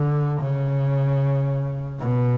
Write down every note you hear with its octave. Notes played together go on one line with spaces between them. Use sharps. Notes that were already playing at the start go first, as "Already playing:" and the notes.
Already playing: D3
C#3
B2